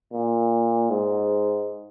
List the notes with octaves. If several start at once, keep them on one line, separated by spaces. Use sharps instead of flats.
A#2
G#2